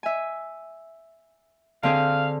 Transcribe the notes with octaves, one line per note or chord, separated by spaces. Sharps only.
E5 G#5
D3 C4 G#4 F5